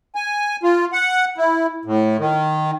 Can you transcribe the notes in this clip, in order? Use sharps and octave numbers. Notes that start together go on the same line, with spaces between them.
G#5
F4
F#5
E4
A2
D#3